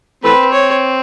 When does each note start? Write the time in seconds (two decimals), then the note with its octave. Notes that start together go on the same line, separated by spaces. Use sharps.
0.23 E3 A3 C4 B4
0.52 C#5